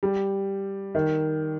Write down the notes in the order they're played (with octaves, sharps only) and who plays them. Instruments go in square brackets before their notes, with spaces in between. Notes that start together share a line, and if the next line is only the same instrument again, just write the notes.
[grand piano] G3
D#3